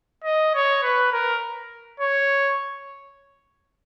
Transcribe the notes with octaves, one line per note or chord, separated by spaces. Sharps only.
D#5
C#5
B4
A#4
C#5